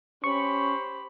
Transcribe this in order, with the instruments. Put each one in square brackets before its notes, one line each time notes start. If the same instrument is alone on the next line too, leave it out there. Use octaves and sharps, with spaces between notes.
[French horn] C#4 [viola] G4 B5 [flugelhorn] C5 [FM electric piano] C#6